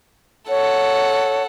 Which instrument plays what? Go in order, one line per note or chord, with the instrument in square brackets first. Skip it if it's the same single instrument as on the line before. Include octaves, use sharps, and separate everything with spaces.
[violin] A4 F#5 [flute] C#5